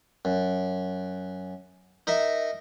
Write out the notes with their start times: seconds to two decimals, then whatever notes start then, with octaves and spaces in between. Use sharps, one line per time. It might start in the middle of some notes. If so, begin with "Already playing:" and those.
0.25 F#2
2.07 D#4 A#4 E5